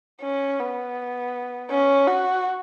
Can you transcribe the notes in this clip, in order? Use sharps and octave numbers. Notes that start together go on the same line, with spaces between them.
C#4
B3
C#4
F#4